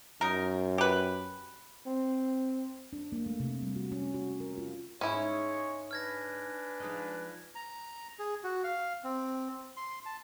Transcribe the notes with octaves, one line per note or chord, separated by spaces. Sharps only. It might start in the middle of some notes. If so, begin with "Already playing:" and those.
F#2 D#4 A#4
G4 B4
C4
D4
A#3
A3
C3
G3
F#4
C#4
F#4
A#4
F4
G#2 G#3 C#4 D#4 E4 C#5
D4 B4 G#5 F6 G#6 A#6
F3 G#3 D#4
A#5
G#4
F#4
F5
C4
C6
A5